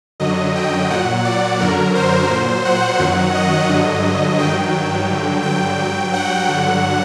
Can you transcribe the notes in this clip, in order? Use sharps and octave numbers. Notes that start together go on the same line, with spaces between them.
F#2 D3 F#3 D#5
G5
A#2 F#3 F#5
D5
F#2 D3 F#3 A#4
C5
A#2 F#3
F#5
F#2 D#3 F#3
D#5
G2 D3 F#3
G2 D#3 F#3 G5
G5
G2 D3 F#3
G5
G2 F#3
F#5
G2 D3 F#3